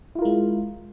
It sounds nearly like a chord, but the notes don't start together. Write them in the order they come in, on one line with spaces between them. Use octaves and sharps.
E4 F4 A#4 G#3